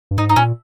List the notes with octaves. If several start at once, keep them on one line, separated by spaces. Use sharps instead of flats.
G2
G#2 D#4
D#4
A#2 C#4